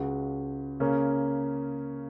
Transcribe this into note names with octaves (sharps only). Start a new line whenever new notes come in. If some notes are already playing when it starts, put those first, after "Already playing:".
Already playing: C#2 C#3 G#3 F#4
C#3 A#3 C#4